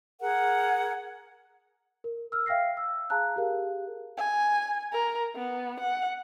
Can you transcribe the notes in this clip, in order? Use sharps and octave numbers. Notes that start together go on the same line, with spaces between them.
G#4 A#4 F#5
A#4
E6 F6
E5 F5 G5 F6 A#6 C7
E6
G#4 F5 A5 A#5 F#6
G4 G#4 A#4 F5
G#5
A#4
B3
F#5